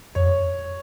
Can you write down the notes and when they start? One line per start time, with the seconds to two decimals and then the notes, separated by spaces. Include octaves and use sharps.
0.15 F2 C#5